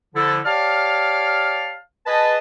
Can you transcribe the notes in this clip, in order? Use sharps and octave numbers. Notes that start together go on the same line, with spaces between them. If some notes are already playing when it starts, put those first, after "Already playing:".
D3 F3 E4 A4
G4 C#5 D5 F5 A5 F6
G#4 B4 D#5 A5